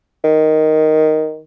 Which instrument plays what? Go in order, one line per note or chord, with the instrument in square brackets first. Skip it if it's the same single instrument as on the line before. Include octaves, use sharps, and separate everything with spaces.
[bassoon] D#3